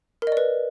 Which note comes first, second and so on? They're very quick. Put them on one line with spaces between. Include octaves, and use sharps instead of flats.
A#4 D#5 D5 B4